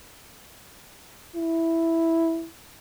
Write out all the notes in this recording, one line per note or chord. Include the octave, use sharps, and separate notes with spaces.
E4